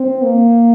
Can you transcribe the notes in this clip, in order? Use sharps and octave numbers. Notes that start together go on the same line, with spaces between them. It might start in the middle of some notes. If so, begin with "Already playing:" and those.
Already playing: C4
A#3